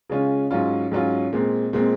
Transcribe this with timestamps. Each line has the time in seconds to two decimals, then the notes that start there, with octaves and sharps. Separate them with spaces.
0.10 C#3 G#3 C#4 F4
0.51 G#2 F#3 C#4 F4
0.91 G#2 F#3 C#4 F4
1.33 A#2 G#3 C4
1.73 A#2 G#3 C4